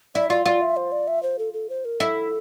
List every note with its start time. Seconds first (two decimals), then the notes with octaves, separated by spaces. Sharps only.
0.15 E4 D5
0.30 F4 D5
0.46 F4 D5
0.61 E5
0.77 C5
0.92 D5
1.08 E5
1.23 C5
1.39 A4
1.54 A4
1.70 C5
1.85 A#4
2.00 E4 A4